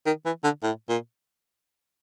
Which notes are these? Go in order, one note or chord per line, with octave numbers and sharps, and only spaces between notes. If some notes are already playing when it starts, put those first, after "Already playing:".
D#3
E3
D3
A2
A#2